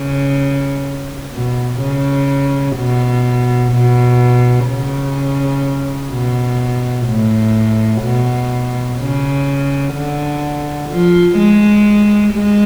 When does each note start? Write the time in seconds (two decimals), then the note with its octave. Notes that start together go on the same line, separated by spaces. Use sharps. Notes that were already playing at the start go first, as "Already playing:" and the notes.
Already playing: C#3
1.33 B2
1.81 C#3
2.77 B2
3.72 B2
4.68 C#3
6.12 B2
7.07 A2
8.03 B2
8.98 C#3
9.94 D3
10.90 F3
11.38 G#3
12.33 G#3